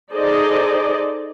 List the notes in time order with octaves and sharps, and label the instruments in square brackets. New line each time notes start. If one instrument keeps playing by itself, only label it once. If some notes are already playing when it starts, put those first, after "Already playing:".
[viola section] D#4 G#4 A4 C5 D5 D#5